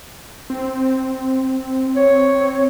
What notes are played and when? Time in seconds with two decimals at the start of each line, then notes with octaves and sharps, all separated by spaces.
0.50 C4
1.96 C4 C#5